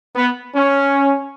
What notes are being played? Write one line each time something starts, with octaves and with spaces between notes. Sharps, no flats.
B3
C#4